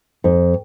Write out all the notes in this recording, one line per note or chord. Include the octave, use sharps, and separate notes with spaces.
F2